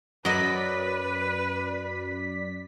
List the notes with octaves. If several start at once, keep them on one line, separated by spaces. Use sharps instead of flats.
F#2 F#3 B4 D5 D#5 B6